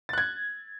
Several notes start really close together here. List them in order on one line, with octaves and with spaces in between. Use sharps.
A6 F#6 G#6